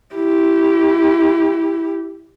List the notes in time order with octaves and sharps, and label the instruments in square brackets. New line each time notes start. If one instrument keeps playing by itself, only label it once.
[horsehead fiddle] E4 G4